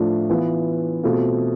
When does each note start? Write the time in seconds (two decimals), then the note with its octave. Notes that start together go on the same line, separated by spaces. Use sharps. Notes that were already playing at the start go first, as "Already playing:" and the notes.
Already playing: A2 F3 A3 D4 F4
0.29 E3 B3 F4
1.03 B2 A3 C4 F4